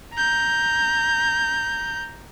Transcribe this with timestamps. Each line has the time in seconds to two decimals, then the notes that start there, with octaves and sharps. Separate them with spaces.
0.14 A#5 G6